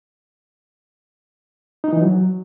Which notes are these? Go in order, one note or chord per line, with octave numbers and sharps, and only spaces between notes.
D#4
E3
F#3